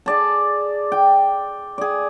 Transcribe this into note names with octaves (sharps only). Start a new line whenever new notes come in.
G#4 D5 A5
G5
G#4 D5